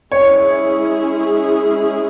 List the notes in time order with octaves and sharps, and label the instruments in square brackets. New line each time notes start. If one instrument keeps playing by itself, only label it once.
[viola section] G#3 C#4 E4 G#4 [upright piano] C#5